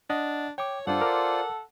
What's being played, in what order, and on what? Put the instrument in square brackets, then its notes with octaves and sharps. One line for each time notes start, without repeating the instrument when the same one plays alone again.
[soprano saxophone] D4 [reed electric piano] D#5 F#5
[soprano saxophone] C#5 [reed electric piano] G5 D6
[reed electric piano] G2 D4 [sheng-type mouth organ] F4 C5 D5 [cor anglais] A4 [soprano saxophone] F#5
[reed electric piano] A#4 D6 F6